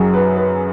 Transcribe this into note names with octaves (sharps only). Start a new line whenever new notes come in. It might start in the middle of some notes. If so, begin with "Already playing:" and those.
Already playing: F#2 F#3 G#4
B4
B4